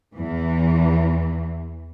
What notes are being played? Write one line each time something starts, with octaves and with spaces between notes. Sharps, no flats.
E2 E3